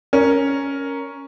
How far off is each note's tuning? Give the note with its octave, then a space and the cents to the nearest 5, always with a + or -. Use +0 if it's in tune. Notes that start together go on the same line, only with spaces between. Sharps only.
C#4 +0 A#4 +0